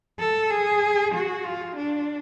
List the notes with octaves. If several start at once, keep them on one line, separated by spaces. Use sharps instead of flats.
A4
G#4
F#4
F4
D4